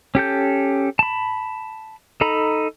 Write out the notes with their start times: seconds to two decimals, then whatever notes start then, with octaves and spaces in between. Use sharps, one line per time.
0.15 C#4 G4 A4 G6
0.99 A5 B5
2.21 D#4 A4 A#5 B5